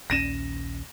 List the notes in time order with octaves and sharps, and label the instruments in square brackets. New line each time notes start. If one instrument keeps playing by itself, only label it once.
[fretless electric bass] A#1 D#2 C#4 [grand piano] A#6 D#7 E7